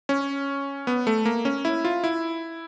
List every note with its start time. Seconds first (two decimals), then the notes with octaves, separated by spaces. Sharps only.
0.09 C#4
0.87 B3
1.07 A3
1.26 A#3
1.45 C#4
1.65 E4
1.85 F4
2.04 E4